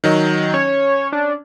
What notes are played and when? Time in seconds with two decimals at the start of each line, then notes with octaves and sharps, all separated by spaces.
0.04 D#3 F#3 D#5
0.54 C#4 C#5
1.12 D4